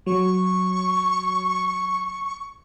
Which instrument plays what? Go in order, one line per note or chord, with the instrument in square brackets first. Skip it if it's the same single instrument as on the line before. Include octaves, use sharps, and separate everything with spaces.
[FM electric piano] F#3 [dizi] C#6